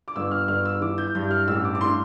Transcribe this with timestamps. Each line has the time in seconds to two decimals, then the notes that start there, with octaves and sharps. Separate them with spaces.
0.08 D6
0.16 G1 E6
0.31 F6
0.48 G1 F6
0.65 E6
0.81 E3 D6
0.98 G6
1.15 G2 G6
1.31 F6
1.48 A1 E6
1.65 D6
1.75 D6
1.81 A2 C6